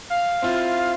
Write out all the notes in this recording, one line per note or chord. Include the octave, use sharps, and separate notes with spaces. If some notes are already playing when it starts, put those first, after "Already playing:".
F5
C4 E4 F4